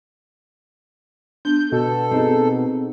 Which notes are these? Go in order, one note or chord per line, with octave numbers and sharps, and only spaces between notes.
B3 D4 G6
B2 A4
C4 D#4 G#4